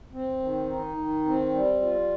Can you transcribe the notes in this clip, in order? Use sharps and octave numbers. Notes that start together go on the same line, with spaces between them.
C4
D#3
D#4
D#3
C4
G3
F4